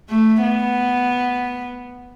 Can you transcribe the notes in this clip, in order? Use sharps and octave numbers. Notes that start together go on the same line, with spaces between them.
A3
B3